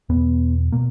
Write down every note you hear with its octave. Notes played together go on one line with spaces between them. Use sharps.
E2 B2 B3
B2 A#3